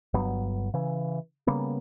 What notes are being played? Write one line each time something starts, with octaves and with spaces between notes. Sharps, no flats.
G1 G2 F#3 B3
C#3 E3
C#3 G3 A#3 B3